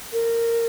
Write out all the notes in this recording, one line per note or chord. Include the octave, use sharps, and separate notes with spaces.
A#4